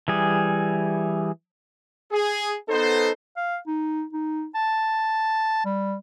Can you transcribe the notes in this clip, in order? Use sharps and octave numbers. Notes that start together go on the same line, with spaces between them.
E3 G3 G#4
G#4
B3 D#4 A4 C5
F5
D#4
D#4
A5
G3